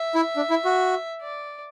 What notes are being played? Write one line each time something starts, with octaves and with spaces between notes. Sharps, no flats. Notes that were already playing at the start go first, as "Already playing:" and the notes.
Already playing: E5
E4
D4
E4
F#4
D5